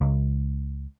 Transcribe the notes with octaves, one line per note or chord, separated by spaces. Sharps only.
C#2